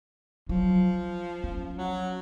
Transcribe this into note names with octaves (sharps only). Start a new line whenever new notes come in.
F3 F#3
C#4
F#3